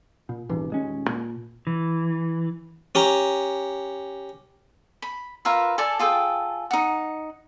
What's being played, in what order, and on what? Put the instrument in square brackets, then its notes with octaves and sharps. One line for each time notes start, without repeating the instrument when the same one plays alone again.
[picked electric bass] A#2
D#1 G#1 E3
D#1 G#3 C#4
A#2
[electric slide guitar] E3
[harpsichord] C#4 G4 A#5
[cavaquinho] B5
F4 A#4 B4 E5
A4 D5 G#5 A5
F4 G#4 A4 G5
D#4 F#5